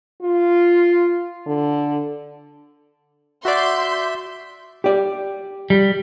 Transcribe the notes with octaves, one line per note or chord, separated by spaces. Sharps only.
F4
D3
F#4 D5 E5 C6 G6
G4 D5
G3